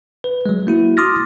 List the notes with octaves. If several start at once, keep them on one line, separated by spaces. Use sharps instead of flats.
B4
F#3 G#3
A#3 E4 F#4
C6 D6 D#6 F6 A6 A#6